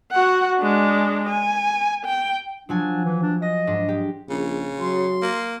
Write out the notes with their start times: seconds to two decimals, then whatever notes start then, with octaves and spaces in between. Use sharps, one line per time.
0.12 F#4 F#5
0.59 G#3 D4
1.29 G#5
2.05 G5
2.69 F3 F#3 D4 G#5
3.05 E3
3.23 D4
3.42 D#5 A#6
3.67 G#2 D4
3.89 G4
4.30 A#1 C#3
4.80 F#3 C6
5.22 A#3